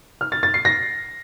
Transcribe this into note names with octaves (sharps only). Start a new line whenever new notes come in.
F6
A6
A6
C7
A#6